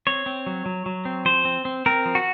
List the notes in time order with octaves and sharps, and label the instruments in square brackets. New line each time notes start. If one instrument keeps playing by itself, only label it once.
[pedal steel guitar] C4 C#5
C4
F#3
F#3
F#3
C4
F3 C5
C4
C4
C4 A#4
F3
F#4